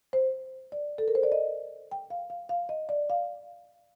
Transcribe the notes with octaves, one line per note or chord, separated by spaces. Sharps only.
C5
D5
A4
A#4
C5
D5
D#5
G5
F5
F5
F5
D#5
D5
F5